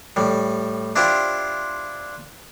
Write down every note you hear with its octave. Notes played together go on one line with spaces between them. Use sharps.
A2 G3
D4 E4 F4 G4 C5